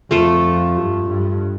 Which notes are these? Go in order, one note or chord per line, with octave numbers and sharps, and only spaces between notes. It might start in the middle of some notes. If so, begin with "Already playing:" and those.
F2 A3 F4 A4
G2
G2